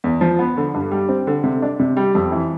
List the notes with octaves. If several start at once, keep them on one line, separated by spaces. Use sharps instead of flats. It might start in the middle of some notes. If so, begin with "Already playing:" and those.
E2
F3
B3
D3
G2
G3
C4
D3
C3
D4
C3
G3
F2
E3